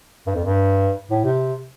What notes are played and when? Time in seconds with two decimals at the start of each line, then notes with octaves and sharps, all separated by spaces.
0.27 G2
0.35 F2
0.45 G2
1.11 A2
1.24 C3